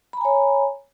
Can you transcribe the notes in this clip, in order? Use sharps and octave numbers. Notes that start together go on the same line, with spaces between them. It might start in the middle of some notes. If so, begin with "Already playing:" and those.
C#5 G#5 A#5 B5